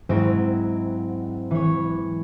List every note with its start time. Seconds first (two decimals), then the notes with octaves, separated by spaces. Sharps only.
0.09 G#2 F#3 G#3 C4 E4
1.51 E3 C#5